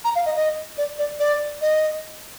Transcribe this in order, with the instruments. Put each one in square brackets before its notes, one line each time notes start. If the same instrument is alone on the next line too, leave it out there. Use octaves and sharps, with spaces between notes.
[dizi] A#5
F5
D#5
D#5
D5
D5
D5
D#5